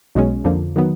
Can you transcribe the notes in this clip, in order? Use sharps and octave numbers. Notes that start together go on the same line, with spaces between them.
B1 B2 G#3 C#4
F2 D3 F3 A#3
D#3 F#3 B3